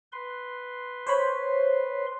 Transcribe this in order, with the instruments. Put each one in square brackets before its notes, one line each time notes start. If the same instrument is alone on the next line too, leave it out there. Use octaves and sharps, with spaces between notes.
[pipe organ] B4 C6
[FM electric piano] C5 C#5 B5